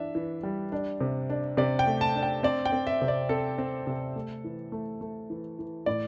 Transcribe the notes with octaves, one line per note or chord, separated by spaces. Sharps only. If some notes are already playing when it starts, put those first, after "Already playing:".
Already playing: E3 D4 E5
E3
G3
D4
C3
D4
C3 D5
G5
A3
A5
D4
G5
C4 D5
G5
C4
E5
C3
D5
C4 A4
C4
C3
A3
E3
A3
A3
E3
E3
A2 D5